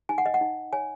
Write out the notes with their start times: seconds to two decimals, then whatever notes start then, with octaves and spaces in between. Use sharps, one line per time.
0.09 D#4 G#5
0.18 F#5
0.26 D#5
0.34 F#5
0.41 D#4
0.73 C#5 G#5